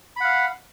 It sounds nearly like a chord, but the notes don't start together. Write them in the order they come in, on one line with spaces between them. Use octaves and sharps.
B5 F#5 F5